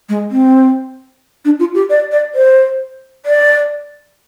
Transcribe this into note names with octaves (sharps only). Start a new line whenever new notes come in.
G#3
C4
D4
F4
G4
D5
D5
C5
D5